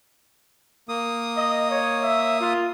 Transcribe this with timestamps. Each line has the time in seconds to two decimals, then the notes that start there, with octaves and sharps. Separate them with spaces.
0.89 A#3 D#6
1.35 D#5
1.69 C#5
2.01 E5
2.40 F4